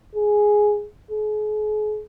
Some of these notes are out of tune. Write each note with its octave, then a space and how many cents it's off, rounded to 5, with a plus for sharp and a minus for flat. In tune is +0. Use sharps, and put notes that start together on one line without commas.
G#4 +5
G#4 +40